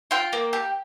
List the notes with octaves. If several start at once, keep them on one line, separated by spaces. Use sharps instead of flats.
F4 G5
A#3
G4